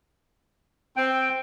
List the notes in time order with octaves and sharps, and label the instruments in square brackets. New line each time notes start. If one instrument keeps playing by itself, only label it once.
[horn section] C4 [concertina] G5